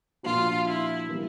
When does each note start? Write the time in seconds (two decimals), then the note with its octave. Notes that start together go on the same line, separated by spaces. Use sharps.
0.23 A#2 F3 A#3 D4 F4 F#4
0.67 E4
1.09 E3 G3 A#3